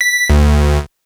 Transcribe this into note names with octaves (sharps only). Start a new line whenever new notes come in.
B6
D2